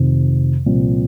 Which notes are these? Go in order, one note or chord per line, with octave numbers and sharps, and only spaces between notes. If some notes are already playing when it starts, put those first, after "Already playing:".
Already playing: F1 F2 C3 D#3
C2 A#2 F3 C4